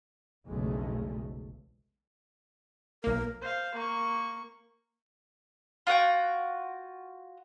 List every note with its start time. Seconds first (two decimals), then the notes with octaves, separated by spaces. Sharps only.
0.47 F1 B1 E2 C#3 G#3 A3
3.04 B1 A#3 A#4
3.42 C5 F5
3.75 A#3 C#6
5.87 F4 F#4 F#5 G5